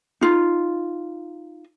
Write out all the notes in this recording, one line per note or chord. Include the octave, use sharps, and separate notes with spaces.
D#4 F4